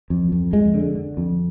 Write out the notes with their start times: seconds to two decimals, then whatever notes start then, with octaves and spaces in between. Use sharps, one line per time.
0.10 F2
0.32 F2
0.53 F2 G#3
0.74 D3
0.96 D3
1.17 F2